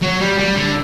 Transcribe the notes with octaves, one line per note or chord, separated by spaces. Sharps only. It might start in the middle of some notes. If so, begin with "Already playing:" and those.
F#3
G3
G3
D3